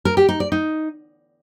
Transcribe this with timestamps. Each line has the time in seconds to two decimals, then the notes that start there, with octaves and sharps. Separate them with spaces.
0.05 A#4
0.17 G4
0.29 D#4
0.40 D5
0.52 D#4